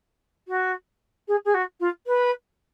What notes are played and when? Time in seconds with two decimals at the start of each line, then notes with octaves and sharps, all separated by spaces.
0.48 F#4
1.28 G#4
1.45 G#4
1.54 F#4
1.80 F4
2.07 B4